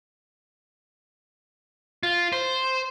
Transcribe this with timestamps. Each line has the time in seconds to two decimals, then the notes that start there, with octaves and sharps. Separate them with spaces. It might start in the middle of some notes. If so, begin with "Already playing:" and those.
2.03 F4
2.33 C5